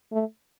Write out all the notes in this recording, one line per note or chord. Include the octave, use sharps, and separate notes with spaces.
A3